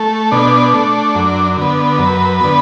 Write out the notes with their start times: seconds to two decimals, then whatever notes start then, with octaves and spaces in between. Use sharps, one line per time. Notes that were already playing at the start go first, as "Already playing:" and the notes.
Already playing: A3
0.32 B2 D4
0.74 A3
1.15 F#2
1.58 D3 B3
1.99 F#2 B4
2.40 D3 B3